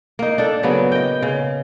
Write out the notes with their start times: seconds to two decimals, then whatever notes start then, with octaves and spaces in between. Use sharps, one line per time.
0.19 A#3 D#4
0.38 D4 A4
0.63 C#3 F#3 A#3 B3
0.92 D#5 G5
1.22 C#3